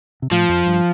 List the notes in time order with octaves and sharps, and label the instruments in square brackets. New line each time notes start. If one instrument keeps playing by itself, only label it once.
[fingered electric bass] C3
[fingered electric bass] A2 [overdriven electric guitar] F3
[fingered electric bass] F2
G2